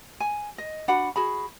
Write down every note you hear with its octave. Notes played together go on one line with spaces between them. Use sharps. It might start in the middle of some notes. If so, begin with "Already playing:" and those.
G#5
D#5
D4 F#4 F#5 B5
F#4 G#4 B5